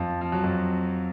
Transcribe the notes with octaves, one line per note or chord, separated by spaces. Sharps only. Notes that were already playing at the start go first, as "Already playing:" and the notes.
Already playing: F2 F3
F3
F#3
F2 F3